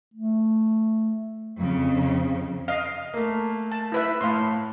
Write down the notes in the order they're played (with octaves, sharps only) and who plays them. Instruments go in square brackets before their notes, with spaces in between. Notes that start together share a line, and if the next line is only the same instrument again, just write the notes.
[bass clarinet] A3
[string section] F2 C#3
[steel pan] D#5 F5
[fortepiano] A3 A#3
[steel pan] A5
E4 B4 E5
[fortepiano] A2 [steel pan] F5 C6